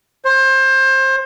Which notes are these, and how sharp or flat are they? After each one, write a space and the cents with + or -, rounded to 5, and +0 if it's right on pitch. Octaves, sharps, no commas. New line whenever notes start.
C5 +25